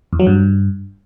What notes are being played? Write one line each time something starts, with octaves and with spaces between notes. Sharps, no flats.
E2
F#3
G2